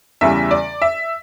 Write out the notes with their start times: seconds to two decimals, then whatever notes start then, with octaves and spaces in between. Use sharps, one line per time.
0.21 E2 C#3 E3 G3 E5
0.51 D5
0.82 E5